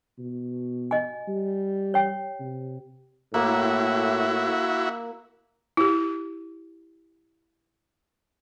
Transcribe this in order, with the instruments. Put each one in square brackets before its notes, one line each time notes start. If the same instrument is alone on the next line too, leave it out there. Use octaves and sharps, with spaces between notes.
[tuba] B2
[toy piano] D#5 G#5
[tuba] G3
[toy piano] C#5 G5
[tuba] C3
[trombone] A2 [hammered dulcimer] A#3 [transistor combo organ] E4 F#4
[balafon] E4 G4